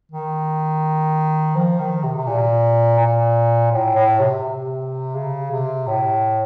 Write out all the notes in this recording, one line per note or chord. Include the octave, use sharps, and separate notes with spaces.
D#3
F3
D#3
C3
C3
A#2
A#2
A2
A2
C3
C3
C#3
C3
A2